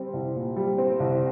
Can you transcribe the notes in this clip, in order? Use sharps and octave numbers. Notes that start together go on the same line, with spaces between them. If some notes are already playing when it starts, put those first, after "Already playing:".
Already playing: G3 C4
C2
A#2
G3
C4
C2